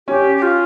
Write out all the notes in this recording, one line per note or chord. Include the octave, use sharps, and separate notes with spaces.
C#4 G4
G4
F4